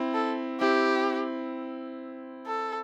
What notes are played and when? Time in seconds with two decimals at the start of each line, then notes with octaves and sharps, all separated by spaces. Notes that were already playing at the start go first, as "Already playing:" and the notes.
Already playing: C4 E4
0.14 A4
0.60 C4 E4 G4
2.47 A4